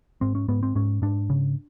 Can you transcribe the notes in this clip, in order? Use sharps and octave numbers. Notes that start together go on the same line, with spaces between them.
G#2 C4
C#4
G#2 B3
C4
G#2 C#4
G#2 D4
C#3